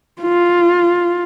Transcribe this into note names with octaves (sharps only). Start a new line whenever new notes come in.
F4